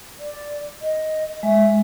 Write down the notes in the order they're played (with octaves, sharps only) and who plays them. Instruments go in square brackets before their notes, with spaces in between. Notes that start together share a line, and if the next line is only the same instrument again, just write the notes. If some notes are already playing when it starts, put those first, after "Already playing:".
[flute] D5
D#5
[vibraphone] G#3 [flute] E5